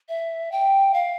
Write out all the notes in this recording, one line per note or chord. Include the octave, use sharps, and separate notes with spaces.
E5
G5
F5